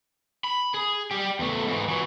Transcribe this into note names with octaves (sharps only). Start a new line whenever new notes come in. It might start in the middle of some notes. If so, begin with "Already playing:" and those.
B5
G#4
G3 G4
E2 A3
G#2 E3
E3 F#3